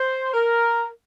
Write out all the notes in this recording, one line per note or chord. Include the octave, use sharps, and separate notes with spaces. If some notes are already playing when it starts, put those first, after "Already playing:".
Already playing: C5
A#4